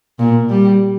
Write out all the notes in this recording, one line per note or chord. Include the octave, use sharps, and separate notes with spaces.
A#2
G3